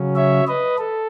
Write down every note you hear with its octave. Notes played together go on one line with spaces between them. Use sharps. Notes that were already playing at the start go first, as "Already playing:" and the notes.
Already playing: C#3 F#3 C#4
C#5 E5
B4 D#5
A4